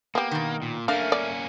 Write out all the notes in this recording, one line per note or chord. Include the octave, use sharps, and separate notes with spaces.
A#3 B3 G4
B2 D#3
A#2
A3 A#3 C#4 D4 A#4 F5
D5